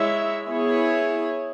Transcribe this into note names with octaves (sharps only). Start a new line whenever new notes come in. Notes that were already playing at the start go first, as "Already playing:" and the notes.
Already playing: G#3 E4 C#5 E5
B3 E4 G#4 C#5